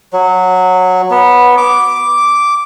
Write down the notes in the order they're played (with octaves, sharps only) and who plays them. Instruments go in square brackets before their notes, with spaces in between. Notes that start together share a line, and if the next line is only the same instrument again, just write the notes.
[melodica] F#3
B3
D6